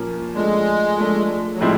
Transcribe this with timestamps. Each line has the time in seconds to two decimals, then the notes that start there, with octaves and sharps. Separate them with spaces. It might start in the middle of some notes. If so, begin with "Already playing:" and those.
Already playing: A#2 F3 A#3 C#4
0.35 F3 G#3 A3 D4
0.97 F3 A3 D4
1.54 F#3
1.60 A2 F3 G3 G#3 C4 E4